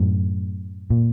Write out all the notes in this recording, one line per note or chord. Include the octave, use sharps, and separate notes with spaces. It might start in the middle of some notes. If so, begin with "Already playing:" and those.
Already playing: F#2 A2
A#2